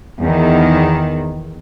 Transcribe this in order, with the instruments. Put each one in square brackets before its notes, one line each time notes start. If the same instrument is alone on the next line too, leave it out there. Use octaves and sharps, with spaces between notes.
[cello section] E2 D#3